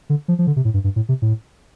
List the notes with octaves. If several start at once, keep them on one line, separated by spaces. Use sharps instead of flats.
D3
F3
F3
D3
C3
A2
G2
G2
A2
C3
A2